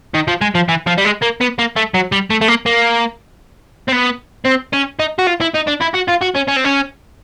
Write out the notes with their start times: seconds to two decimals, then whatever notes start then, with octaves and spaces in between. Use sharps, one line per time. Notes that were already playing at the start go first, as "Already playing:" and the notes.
0.14 D#3
0.28 F3
0.41 G#3
0.55 F3
0.69 E3
0.87 F3
0.98 G3
1.05 G#3
1.22 A#3
1.41 B3
1.59 A#3
1.76 A3
1.94 F#3
2.12 G3
2.30 A3
2.41 A3
2.48 A#3
2.66 A#3
3.88 C4
3.92 B3
4.45 C4
4.74 C#4
5.00 D#4
5.19 F#4
5.27 F4
5.41 E4
5.54 D#4
5.67 D4
5.81 E4
5.94 F#4
6.08 F4
6.21 F#4
6.35 C#4
6.48 C#4
6.56 C4
6.64 C#4